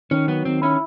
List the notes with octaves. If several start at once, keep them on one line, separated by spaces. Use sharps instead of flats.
D#3 C#4
F#3 B3
D#3 C4
C#4 E4